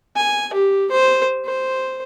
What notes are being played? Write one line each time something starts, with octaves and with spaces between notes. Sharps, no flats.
G#5
G4
C5
C5